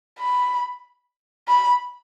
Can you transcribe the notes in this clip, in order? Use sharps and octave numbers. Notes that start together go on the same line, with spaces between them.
B5
B5